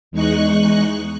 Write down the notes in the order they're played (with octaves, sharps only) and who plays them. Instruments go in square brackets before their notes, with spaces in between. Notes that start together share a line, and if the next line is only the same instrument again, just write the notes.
[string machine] E2 G#3 D#4 C#6 F#6